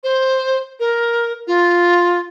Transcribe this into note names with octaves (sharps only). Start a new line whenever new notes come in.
C5
A#4
F4